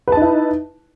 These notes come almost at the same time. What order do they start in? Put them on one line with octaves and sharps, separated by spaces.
B4 A5 D#4 E4